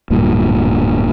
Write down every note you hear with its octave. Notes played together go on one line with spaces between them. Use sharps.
D1 G2 A#2